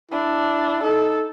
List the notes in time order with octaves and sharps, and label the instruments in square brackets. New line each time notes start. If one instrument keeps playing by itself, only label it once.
[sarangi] D4 [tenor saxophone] E4
[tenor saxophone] D#4 [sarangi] A4